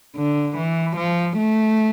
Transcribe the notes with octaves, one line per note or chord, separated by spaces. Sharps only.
D3
E3
F3
A3